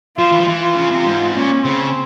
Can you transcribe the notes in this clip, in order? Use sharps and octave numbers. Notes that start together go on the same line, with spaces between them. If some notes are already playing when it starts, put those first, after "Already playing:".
F3 F4
E3
F3
E3 F4
C#3
C3
G#2
A#2 C#4
C#3 C4